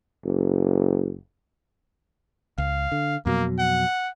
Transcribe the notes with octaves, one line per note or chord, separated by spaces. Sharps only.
F#1
C#2 F5
D3
F2 B2 F#3 A#3
F#5